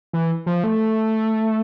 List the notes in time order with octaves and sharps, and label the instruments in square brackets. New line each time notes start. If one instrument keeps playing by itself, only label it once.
[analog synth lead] E3
F3
A3